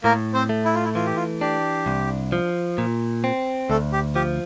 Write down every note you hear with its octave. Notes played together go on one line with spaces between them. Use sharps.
A2 A#3 A#4
C4 C5
A3
E4
F4
E4
E3 F4
G4
F4
D4 G4
C2
F3
A#2
C4
D2 A3 A4
G4
F3 G4